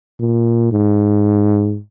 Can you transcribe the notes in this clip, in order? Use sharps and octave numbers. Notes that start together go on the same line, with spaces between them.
A#2
G#2